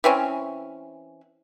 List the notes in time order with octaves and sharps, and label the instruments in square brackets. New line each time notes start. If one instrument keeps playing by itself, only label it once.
[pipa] E3 C4 C#4